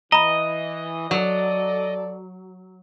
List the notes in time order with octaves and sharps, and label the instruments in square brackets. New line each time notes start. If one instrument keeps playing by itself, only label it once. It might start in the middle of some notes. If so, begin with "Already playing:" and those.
[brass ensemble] E3 [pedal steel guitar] D#5 [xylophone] A#5 B5
[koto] F#3 [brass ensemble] A4 D5